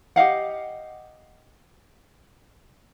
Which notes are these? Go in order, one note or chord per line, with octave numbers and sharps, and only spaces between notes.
G4 D#5 F5 F#5